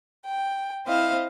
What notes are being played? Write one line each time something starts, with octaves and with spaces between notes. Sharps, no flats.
G5
C4 E4 C5 D#5 F5